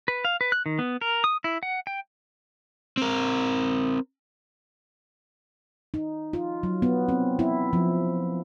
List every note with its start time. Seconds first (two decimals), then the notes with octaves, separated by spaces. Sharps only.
0.08 B4
0.25 F5
0.41 B4
0.52 F#6
0.66 D#3
0.79 B3
1.01 A#4
1.24 D#6
1.44 E4
1.63 F#5
1.87 G5
2.97 C4 A#4
5.94 D#4
6.33 F4
6.63 F#3
6.82 B3
7.09 C4
7.39 E4
7.73 F3